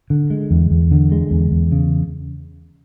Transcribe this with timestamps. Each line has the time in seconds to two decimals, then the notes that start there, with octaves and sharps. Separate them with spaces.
0.10 D3
0.30 G#3
0.51 E2
0.71 E2
0.91 D3
1.12 G#3
1.31 E2
1.52 E2
1.72 C#3